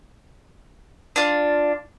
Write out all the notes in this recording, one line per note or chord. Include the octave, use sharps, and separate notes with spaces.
D4 F4